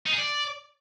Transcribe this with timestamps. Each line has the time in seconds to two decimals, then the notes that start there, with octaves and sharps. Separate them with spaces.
0.06 D#4
0.12 G#4
0.18 D5